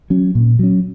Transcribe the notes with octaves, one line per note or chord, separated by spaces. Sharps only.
F#3 C#4
A#2
F#3 C#4